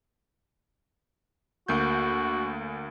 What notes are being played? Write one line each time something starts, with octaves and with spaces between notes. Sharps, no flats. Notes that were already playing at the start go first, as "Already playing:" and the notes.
D2 A#3 F#4 G6